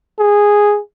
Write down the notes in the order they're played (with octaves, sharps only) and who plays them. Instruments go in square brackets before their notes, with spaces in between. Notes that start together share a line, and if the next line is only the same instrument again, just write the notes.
[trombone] G#4